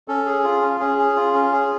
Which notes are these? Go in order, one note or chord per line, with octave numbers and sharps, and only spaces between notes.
C#4 A4
G#4
F4
C#4
C#4 G#4
G#4
F4
C#4
G#4